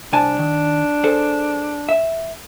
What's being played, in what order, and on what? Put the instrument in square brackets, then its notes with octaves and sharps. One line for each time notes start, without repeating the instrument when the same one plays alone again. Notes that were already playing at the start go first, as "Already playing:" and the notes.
[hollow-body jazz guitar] C2 G#5 A5 [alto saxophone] D4
[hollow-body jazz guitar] D#3
G#4 A4 C5
E5